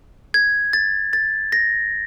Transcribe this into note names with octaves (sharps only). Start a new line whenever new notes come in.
G#6
A6
A6
A#6